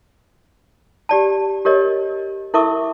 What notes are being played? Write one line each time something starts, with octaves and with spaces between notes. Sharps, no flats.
G4 D5 A5
G4 A#4 C#5 D#5
E4 A4 A#4 E5 C#6 D6